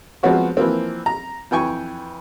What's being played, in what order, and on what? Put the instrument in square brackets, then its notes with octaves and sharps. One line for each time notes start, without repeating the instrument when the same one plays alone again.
[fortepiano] F3 G#3 B3 C4 F#4 C#5
E3 F3 A#3 C4
A#5
F2 E3 G5 G#5 C#6